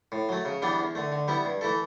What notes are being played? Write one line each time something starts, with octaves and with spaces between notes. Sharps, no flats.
A2
F#3 A3
C#3
E3 G3 B3 D4
E2
D3 A3
D3
G3 B3 E4
G2
E3 A3 E4 A4